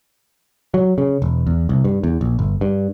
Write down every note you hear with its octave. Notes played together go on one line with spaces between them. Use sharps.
F#3
C#3
E1
E2
C2
G2
E2
A#1
G1
G2